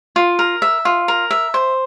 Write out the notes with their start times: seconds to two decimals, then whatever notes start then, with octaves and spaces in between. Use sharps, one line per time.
0.16 F4
0.39 A#4
0.62 E5
0.85 F4
1.08 A#4
1.31 E5
1.54 C5